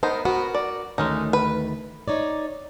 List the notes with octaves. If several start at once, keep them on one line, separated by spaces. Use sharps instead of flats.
B3 D#4 A#4 C5
B3 F#4 A#4
D5
D2 D#3 G#3 A3 C#4 D#4
B4
D#4 C#5 D5